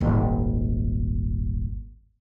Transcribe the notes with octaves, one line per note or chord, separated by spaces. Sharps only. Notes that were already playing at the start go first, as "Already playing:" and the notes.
D#1 G#1